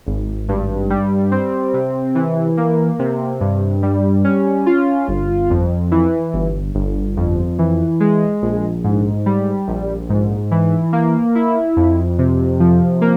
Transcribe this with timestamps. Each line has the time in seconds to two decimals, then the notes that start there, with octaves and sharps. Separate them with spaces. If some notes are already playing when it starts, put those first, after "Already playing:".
0.06 G#1
0.49 G2
0.90 G3
1.32 C4
1.74 C3
2.15 E3
2.57 A#3
2.99 C3
3.41 G2
3.83 G3
4.25 C#4
4.66 F4
5.08 G1
5.50 F2
5.91 E3
6.33 G1
6.75 G1
7.17 F2
7.59 E3
8.00 G#3
8.42 A#1
8.84 G#2
9.26 G3
9.68 A#1
10.10 G#2
10.51 E3
10.93 A#3
11.35 E4
11.77 F2
12.19 C3
12.60 F3
13.01 A#3